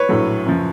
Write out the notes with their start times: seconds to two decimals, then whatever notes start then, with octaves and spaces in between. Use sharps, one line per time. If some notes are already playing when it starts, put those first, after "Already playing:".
Already playing: B4 C#5
0.09 A#1 A2 F#3 A3
0.46 F#2 C#3 F3